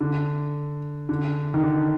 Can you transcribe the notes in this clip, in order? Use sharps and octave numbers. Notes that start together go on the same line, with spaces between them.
D3
D3
D#3
D3